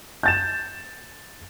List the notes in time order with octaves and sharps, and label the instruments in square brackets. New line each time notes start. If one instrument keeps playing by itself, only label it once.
[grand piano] G6 A6 E7